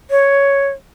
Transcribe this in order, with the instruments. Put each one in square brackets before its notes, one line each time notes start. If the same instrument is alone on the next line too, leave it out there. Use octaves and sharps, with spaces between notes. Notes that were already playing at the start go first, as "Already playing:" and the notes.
[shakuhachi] C#5